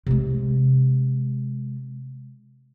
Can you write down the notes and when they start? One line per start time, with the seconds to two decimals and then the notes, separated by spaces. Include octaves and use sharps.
0.07 C3 G#3